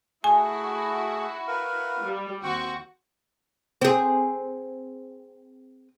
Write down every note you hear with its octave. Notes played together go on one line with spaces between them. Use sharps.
A3 E4 F#4 G#4 G#5
A#4 B4 F5
G3
D#2 C4 F#4 G5 C#6
C4 G#4